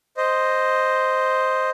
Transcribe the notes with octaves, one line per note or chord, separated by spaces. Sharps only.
C5 D#5